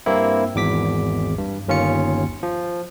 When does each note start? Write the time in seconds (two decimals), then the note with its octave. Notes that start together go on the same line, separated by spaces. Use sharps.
0.06 G2 A#3 C4 E4
0.55 G#1 E2 D6 B6
1.38 G2
1.67 G1 D#2 C#4 F4 C#7
2.43 F3